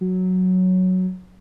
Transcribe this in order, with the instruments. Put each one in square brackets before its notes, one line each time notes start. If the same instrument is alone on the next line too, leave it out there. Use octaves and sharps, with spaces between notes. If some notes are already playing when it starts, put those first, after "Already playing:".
[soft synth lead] F#3